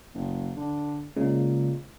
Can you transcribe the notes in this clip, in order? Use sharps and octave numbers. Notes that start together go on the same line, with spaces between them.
F#1
D3
A#2 C#3 G#3